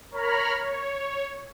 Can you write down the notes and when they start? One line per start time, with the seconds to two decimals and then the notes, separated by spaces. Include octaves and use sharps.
0.11 A#4 C#5 A#5 B5 F6
0.61 C#5